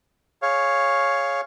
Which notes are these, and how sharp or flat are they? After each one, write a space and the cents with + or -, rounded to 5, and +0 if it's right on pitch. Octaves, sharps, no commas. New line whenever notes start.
G#4 +0 C#5 +0 F5 +0